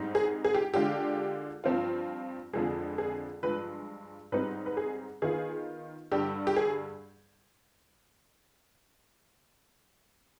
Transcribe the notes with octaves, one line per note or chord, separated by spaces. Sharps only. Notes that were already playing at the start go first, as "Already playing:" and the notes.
Already playing: G#2 G3 C4 D#4
G#4
G#4
G4
D3 G#3 D4 F4 G4
G2 F3 C4 F4
F2 D3 F3 G#3 G#4
G#4
G2 F3 G#3 B4
G#2 G3 C4 D#4 B4
B4
G#4
D#3 B3 F4 G#4
G2 D3 G3 G4
G4
G#4